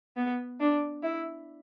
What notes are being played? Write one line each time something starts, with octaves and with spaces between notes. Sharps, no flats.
B3
D4
E4